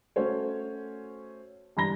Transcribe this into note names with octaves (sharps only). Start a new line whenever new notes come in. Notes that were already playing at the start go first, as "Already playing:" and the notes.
A3 C#4 F#4 C5 C#5
G2 E3 A#5 B5 A#6 G7